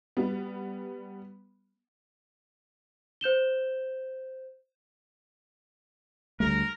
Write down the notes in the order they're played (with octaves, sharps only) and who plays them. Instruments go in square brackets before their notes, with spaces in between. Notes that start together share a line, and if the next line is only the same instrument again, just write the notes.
[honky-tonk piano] G3 B3
[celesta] C5 G6 E7 G7
[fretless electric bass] D2 G3 A3 [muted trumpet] A#4